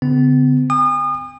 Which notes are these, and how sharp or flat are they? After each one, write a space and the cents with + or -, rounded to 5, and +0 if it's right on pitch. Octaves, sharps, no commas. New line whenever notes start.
D3 -35 B3 +45
G#5 -45 D#6 -35